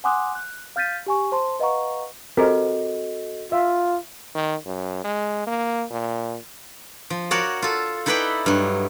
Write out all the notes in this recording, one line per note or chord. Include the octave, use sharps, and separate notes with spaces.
F#5 G#5 C6 D6 D#6 F#6
F#6
F5 F6 G6 A6 B6 D#7
G4 G#5 C#6
C5 A5 C6
B4 D#5 F5 F#5 A#5 C#6
C4 F#4 G4 A4 A#4 D#5
F4 E5 F5
D#3
F#2
G#3
A#3
A#2
F3
F#4 A#4 C#5 D5
F4 A4
D#4 E4 A4 B4 D5 G5
G2 F#3